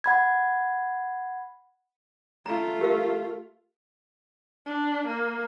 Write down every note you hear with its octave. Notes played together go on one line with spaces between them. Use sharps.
F#5 B5 G#6
A3 F4 A#5
G4 A#4 F5
D4
A#3